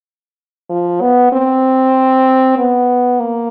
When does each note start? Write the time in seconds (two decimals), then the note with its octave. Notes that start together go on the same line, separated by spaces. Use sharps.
0.70 F3
1.01 B3
1.32 C4
2.57 B3
3.20 A#3